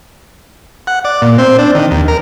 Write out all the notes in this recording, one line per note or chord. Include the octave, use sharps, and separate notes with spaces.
F#5
D5
A#2
C4
D4
D#3
D#2
A#4